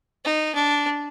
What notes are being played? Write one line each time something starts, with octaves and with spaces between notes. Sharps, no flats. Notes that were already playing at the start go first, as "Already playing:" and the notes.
D#4
D4